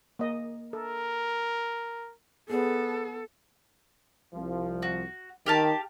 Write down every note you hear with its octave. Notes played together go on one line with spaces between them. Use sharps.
A#3 D#5
A4 A#4
B3 G#4 A4 C5 D5
C2 F3
F#4
D#3 G4 F5 A5